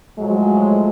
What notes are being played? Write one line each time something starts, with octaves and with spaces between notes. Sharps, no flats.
A2 F3 F#3 G#3